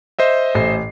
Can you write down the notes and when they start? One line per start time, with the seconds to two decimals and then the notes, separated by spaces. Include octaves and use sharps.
0.19 C5 D#5 E5
0.54 A1 C7